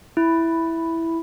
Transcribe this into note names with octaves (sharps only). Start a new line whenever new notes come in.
E4